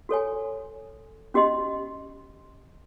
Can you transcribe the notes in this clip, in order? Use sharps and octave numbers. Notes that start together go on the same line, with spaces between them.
F#4 A4 C#5 G#5
C#4 F#4 G4 D#5 C6